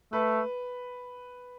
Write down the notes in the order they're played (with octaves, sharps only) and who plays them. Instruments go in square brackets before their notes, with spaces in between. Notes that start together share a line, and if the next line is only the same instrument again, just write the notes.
[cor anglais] A3 [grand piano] B4